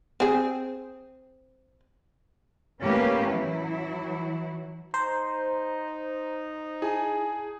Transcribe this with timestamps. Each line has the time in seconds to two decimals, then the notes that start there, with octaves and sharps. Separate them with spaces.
0.20 C4 G#4
2.83 A2 A#3 B3 C#4 G4 B4
3.29 E3 F#3 E4
4.94 D#4 C5 A#5
6.82 E4 G#4 G#5 A5